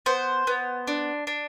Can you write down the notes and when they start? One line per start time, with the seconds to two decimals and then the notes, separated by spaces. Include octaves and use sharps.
0.06 B3 C5
0.47 B3
0.87 D4
1.27 D4